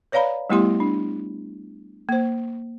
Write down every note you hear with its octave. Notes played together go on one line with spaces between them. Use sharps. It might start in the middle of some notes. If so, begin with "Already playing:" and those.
B4 C#5 D5 F5 A#5 B5
G3 A3 B3 E4 G4 C6
D4
A#3 C5